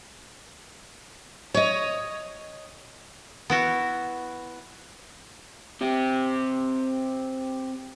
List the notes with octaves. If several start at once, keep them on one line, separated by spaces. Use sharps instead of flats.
C#5 D#5
B3 E4 F#4
C4 G4